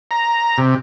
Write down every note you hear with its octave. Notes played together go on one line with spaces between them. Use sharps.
A#5
C3